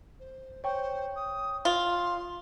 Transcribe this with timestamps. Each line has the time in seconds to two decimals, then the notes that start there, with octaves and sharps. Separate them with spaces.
0.20 C5
0.64 C5 C#5 G5 C#6
1.16 D#6
1.65 F4 C6